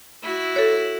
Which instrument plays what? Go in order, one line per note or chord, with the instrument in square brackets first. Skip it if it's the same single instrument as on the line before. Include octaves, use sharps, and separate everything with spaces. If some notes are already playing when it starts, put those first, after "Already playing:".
[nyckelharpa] E4 F#4
[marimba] A4 C#5